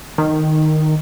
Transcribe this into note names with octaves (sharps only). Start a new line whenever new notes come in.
D#3